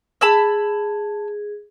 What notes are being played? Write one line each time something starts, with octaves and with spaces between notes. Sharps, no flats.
G#4 A5 B5 E6 G#6